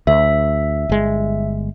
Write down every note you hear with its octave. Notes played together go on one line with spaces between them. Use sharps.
D2 E5
G1 G#3